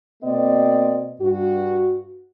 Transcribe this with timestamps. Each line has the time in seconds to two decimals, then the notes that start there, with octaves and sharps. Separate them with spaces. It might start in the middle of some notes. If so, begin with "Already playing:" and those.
0.22 B2 A#3 C4 D5 D#5
1.20 G2 F#4